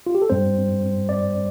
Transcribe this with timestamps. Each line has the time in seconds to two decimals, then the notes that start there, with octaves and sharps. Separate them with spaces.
0.06 F4
0.15 G4
0.22 A4
0.30 G2 G3 C4 C5
1.09 D5